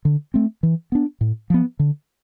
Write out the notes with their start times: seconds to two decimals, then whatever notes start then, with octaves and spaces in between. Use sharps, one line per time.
0.05 D3
0.34 A3 C4
0.63 E3
0.92 B3 D4
1.21 A2
1.50 F3 B3
1.79 D3